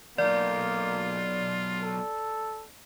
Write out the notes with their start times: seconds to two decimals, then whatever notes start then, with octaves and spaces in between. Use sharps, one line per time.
0.18 B1 E2 A#3 F4 D5
1.83 A4